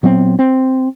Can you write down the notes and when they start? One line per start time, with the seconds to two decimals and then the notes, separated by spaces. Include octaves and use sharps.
0.03 A#2 F#3 B3 C4
0.39 C4